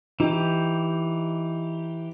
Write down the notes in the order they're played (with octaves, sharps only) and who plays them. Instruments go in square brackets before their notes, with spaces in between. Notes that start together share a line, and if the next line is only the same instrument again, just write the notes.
[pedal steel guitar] E3 G4 [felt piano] D#4